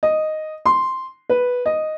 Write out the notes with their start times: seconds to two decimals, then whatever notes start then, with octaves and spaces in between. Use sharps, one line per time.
0.03 D#5
0.66 C6
1.30 B4
1.66 D#5